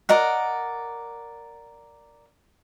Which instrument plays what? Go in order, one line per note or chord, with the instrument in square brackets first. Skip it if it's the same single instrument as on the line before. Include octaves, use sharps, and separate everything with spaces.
[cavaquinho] A#4 D5 D#5 F#5